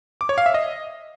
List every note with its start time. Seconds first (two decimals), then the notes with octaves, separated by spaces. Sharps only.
0.21 D6
0.29 C#5
0.38 F5
0.46 E5
0.54 D#5